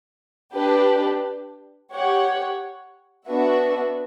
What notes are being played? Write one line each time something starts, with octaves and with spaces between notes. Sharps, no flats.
D4 G4 B4
G4 C#5 F#5
B3 D4 F#4 B4 E5